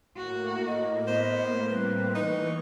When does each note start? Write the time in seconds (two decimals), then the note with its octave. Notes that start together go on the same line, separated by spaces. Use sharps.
0.16 A2 A#3 F#4
0.67 D#5
1.07 B3 C5
1.70 G3 C4 B4
2.15 E3 D#4 C#6